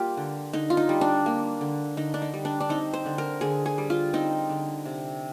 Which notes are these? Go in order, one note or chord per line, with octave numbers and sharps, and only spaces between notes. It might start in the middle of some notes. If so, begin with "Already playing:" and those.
Already playing: G3 A#3 F4 G4
D3
D3 D#4
F4
D#4
G3
D4
A#3
D3
D3 D#4
D4
D#4
G3
D4
D4
C4 D#4
C5
D3
A#4
D3 G#4
G#4
G3
F4
C4 D#4
D3
C3